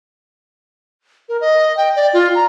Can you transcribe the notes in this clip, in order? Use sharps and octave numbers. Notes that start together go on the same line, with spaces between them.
A#4
D#5
G5
D5
F4
A#5